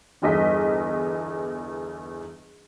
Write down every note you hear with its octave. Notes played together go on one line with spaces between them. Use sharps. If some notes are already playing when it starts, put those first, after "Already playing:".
G1 E2 D#5 B6